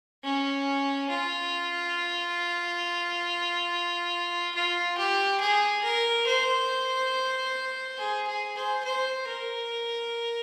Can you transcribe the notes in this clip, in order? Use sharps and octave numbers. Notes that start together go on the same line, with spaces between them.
C#4
F4
F4
G4
G#4
A#4
C5
G#4
G#4
C5
C5
A#4